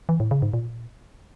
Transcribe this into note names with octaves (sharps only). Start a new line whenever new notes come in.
E3
A2
C#3
G#2
A#2